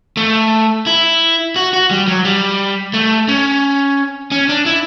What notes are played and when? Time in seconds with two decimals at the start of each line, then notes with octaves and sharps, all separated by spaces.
0.17 A3
0.86 E4
1.56 F#4
1.73 F#4
1.91 G3
2.08 F#3
2.25 G3
2.94 A3
3.28 C#4
4.32 C#4
4.49 D4
4.66 E4